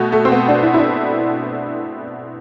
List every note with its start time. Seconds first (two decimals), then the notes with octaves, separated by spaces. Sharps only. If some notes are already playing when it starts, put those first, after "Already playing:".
Already playing: B2 A3
0.12 A3
0.25 C4
0.32 B3
0.48 D4
0.63 E4
0.74 E4
0.78 D4